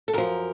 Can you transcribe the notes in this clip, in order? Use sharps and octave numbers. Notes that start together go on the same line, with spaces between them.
A4
F#2 F3 A#4